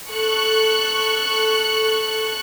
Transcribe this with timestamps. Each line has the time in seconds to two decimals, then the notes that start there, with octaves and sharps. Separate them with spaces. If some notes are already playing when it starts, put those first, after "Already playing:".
0.11 A4 C#6 F#6